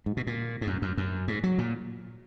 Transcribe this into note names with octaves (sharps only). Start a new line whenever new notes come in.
G#2
B2
A#2
G#2
F#2
F#2
F#2
G#2
F#3
A#2